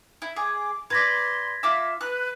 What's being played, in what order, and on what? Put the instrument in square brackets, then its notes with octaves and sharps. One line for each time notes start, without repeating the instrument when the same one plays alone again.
[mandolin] E4
[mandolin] G#4 [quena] D6
[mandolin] B4 D5 [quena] C6 [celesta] G#6 A#6 B6
[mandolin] F4 D6 E6 [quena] E5
[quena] B4 [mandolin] F#6